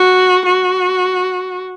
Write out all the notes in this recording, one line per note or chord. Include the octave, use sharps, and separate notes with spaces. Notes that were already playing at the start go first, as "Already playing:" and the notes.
Already playing: F#4
F#4